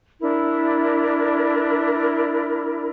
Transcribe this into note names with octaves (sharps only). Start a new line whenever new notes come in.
D4 E4 A#4